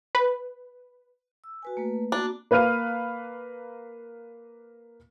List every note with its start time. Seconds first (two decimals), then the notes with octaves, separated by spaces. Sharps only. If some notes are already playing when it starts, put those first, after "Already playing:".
0.15 B4
1.44 E6
1.63 F#4 B4 G#5
1.77 A3 A#3 B4
2.12 A#3 B3 D4 F#4
2.51 A#3 B4 F5 F6 D#7